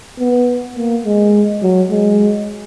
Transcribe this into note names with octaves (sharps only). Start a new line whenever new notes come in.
B3
A#3
G#3
F#3
G#3